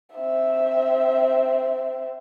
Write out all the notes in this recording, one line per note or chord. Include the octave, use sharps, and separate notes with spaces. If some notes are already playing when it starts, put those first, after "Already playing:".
C4 E5